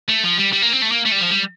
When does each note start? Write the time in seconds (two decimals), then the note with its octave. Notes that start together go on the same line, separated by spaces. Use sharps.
0.09 A3
0.23 F3
0.38 G3
0.52 G3
0.62 A#3
0.72 C4
0.82 A3
0.92 A#3
1.06 A3
1.12 G3
1.21 F3
1.31 G3